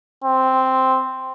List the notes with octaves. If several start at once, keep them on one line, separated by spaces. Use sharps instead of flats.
C4